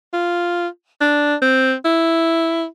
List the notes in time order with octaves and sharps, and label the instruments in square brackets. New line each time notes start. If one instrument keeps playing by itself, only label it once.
[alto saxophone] F4
D4
C4
E4